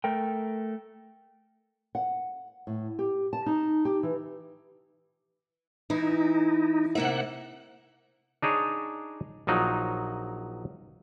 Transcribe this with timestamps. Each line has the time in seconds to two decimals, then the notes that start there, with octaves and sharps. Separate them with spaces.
0.04 A3 A#4 G5
1.95 F#5
2.67 A2
2.99 G4
3.33 A5
3.46 D#4
3.85 G4
4.03 E3
5.90 E3 D#4 E4
6.95 C3 A#3 E5 F#5
8.42 D4 D#4 G#4 C#5
9.47 A#1 F3 F#3 D#4